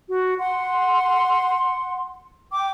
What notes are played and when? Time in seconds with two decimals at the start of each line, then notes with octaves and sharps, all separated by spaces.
0.09 F#4
0.39 F#5 C6
2.52 G5 D6